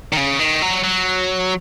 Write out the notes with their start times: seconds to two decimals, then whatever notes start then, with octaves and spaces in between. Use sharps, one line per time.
0.13 D#3
0.17 C#3
0.39 D#3
0.62 F#3
0.84 F#3